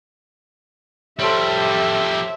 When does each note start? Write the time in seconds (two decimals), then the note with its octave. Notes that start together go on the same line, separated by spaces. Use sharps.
1.19 F3 G3 G4 A4 C5 C#5 E5